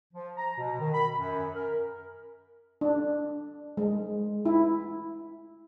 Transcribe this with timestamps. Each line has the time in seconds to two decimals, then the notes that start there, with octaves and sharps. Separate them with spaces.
0.13 F3
0.37 A#5
0.57 B2
0.79 D#3
0.94 B5
1.18 F#2
1.56 A#4
2.81 D4
3.77 G#3
4.46 E4